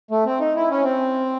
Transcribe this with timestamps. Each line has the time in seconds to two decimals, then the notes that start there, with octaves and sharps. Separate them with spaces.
0.11 A3
0.26 C4
0.40 D#4
0.56 E4
0.71 C#4
0.84 C4